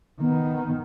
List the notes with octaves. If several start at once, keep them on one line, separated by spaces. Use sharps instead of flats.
D#3 B3